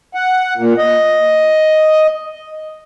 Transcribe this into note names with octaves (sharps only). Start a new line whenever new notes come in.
F#5
A#2
D#5